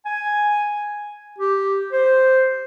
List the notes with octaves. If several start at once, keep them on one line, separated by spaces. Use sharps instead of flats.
G#5
G4
C5